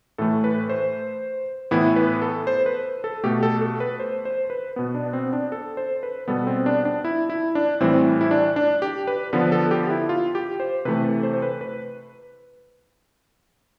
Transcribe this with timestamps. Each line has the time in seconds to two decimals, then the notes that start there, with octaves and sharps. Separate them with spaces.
0.18 A2 E3 A3 A4
0.44 B4
0.70 C5
1.71 A2 E3 B3 E4
1.96 B4
2.22 A4
2.47 C5
2.66 B4
3.04 A4
3.23 B2 A3 G4
3.43 A4
3.62 A4
3.80 B4
4.00 C5
4.25 C5
4.50 B4
4.76 B2 B3
4.95 D4
5.13 C4
5.33 D4
5.52 A4
5.77 C5
6.03 B4
6.28 B2 G3 B3 A4
6.47 C4
6.66 D4
6.85 D4
7.05 E4
7.30 E4
7.55 D4
7.80 A2 E3 G3 C4
8.21 E4
8.31 D4
8.56 D4
8.82 G4
9.07 B4
9.33 D3 F3 B3 B4
9.52 A4
9.71 G4
9.90 E4
10.09 F4
10.35 G4
10.60 C5
10.85 C3 E3 A3 B4
11.04 A4
11.23 C5
11.33 C5
11.42 B4
11.61 B4